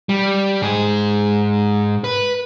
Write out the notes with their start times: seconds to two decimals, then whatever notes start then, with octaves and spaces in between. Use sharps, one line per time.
0.09 G3
0.62 G#2 G#4
2.04 B4